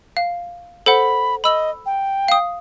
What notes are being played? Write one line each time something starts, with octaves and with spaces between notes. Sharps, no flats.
F5
A4 C5 F#5 B5
D#5 B5 E6 F#7
G5
F5 D#6